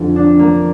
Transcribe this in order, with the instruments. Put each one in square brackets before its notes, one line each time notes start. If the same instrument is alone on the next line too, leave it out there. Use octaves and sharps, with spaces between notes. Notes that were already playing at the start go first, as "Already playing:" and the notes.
Already playing: [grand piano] F2 D3 F3
[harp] D4
A#3